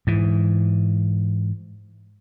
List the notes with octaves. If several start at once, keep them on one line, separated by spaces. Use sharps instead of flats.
G#2 E3